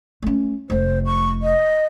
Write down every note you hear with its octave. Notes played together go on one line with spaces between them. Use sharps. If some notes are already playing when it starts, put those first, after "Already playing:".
A3 C#4
F1 A3 C5
C#6
D#5